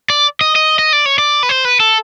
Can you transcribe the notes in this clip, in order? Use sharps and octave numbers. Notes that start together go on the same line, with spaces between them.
D5
D#5
D#5
D#5
D5
C#5
D5
B4
C5
B4
A4